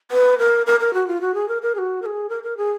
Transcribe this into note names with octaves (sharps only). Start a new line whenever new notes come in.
B4
A#4
A#4
A#4
F#4
F4
F#4
G#4
A#4
A#4
G#4
F#4
A#4
G#4
A#4
A#4
G#4